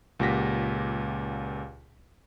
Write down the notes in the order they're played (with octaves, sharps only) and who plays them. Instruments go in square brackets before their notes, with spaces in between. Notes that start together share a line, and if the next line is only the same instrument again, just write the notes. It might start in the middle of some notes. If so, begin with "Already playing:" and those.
[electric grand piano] C#2 A#2 G4 F#5 A#6 B6